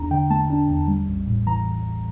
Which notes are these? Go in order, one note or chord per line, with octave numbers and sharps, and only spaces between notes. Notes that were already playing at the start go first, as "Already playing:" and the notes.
Already playing: E2 D4 A#5
D3 G5
A3 A5
D4
E2
G3
A1
A2
E3 A#5